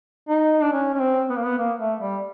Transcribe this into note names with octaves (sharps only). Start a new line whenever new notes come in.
D#4
D4
C#4
C#4
C4
B3
A#3
B3
A#3
A3
G3